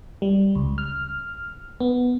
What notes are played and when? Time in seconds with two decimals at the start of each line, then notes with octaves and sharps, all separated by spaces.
0.22 G3
0.55 C#2
0.78 F6
1.80 B3